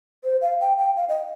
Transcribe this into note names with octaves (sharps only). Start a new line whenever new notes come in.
C5
F5
G5
G5
F5
D#5